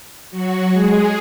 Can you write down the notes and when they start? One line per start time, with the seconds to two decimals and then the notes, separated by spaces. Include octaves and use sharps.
0.31 F#3 F#4
0.72 G#3 G#4